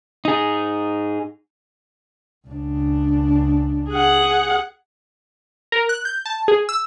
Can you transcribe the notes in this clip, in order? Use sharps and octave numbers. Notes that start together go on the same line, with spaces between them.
D#4 G#4
C#2 D4
G#4 F#5
A#4
F#6
G6
A5
G#4
E6